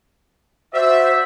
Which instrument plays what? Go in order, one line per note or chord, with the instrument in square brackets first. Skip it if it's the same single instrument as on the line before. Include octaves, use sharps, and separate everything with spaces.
[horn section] F#4 D5 E5 [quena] C5